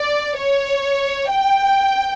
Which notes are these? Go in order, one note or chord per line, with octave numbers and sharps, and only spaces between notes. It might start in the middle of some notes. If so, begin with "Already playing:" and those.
Already playing: D5
C#5
G5